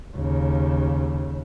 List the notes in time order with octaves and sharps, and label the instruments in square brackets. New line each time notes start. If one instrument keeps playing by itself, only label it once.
[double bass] D#2 C#3